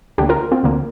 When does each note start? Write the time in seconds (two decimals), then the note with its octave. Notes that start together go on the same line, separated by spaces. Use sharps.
0.18 D2 D3 A#3 D4 G4
0.29 F4 A#4
0.52 C4 F4
0.63 D2 D3 A#3